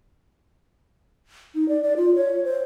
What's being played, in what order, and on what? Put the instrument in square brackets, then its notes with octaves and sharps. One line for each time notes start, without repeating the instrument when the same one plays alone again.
[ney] D#4
D5
D5
F4
C#5
C5